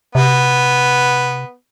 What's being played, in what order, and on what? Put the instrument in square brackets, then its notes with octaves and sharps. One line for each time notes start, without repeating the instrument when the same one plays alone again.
[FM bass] C3 [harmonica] B3